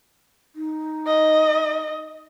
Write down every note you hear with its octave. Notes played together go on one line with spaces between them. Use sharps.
D#4
D#5